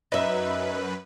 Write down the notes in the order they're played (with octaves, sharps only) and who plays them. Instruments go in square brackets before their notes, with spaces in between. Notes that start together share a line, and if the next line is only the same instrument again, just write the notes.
[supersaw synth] F#2 B4 [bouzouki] D#4 E5